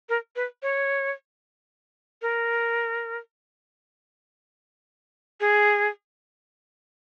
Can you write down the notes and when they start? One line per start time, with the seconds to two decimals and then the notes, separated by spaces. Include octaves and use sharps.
0.09 A#4
0.36 B4
0.63 C#5
2.22 A#4
5.40 G#4